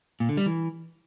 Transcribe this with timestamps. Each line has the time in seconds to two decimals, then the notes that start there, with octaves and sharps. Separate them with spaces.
0.20 A#2
0.29 D3
0.37 G3
0.46 E3